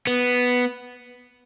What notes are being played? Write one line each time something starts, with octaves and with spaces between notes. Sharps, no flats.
B3